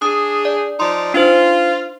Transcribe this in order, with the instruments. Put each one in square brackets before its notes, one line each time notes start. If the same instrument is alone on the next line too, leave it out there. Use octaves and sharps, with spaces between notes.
[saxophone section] D4 G#4 [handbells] D#6
[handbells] D5
[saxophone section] F3 D#4 D5 [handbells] C6
[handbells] D4 D#4 C5 [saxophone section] F4